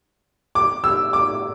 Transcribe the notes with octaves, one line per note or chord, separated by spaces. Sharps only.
D6
E6
D6